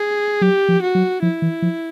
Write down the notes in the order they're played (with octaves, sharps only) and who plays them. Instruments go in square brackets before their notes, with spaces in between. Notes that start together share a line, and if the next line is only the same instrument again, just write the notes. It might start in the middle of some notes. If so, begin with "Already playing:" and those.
Already playing: [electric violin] G#4
[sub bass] F#3 [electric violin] G4
[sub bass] F3
[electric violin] F#4
[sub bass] F#3
[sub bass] F3 [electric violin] E4
[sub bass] E3
F3